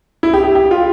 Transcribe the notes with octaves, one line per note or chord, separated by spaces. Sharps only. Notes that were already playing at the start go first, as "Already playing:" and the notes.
E4
G4
G4
G4
F4